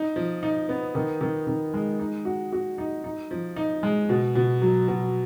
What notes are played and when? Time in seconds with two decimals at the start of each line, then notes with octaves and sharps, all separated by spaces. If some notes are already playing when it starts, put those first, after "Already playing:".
Already playing: D#4
0.16 F3
0.43 D#4
0.69 B3
0.95 D#3
1.21 D#3
1.47 D#3
1.74 G#3
1.99 D#4
2.25 F#4
2.52 F#4
2.78 D#4
3.04 D#4
3.31 F3
3.56 D#4
3.83 G#3
4.09 B2
4.35 B2
4.62 F#3
4.88 B2